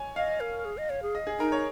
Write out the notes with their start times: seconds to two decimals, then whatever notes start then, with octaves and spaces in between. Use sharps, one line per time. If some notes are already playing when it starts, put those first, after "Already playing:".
Already playing: C#5 G#5
0.16 D#5 F5
0.40 A#4
0.65 G#4
0.77 D#5
0.90 C#5
1.03 G#4
1.15 D#5
1.27 G#4
1.39 D#4 A#4
1.52 C#5